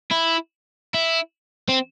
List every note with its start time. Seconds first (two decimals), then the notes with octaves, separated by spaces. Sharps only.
0.11 E4
0.94 E4
1.69 C4